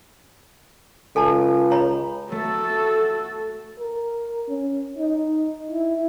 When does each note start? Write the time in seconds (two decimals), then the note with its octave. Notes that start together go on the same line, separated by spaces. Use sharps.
1.16 C#2 A4 G#5 A5
1.71 C#5 A#5 B5
2.32 A3 F#4 A4
3.80 A#4
4.49 C#4
4.98 D#4
5.71 E4